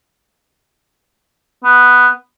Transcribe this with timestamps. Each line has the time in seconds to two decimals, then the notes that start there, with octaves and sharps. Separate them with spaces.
1.64 B3